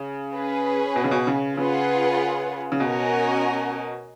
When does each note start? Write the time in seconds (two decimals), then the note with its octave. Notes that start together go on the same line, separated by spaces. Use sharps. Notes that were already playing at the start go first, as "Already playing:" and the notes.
Already playing: C#3
0.34 C#4 G#4 B4
0.96 B2
1.04 C#3
1.11 B2
1.27 C#3
1.57 C#3 F4 G#4 B4 F#5
2.72 C#3
2.80 B2 C#4 F#4 A#4 D#5 G#5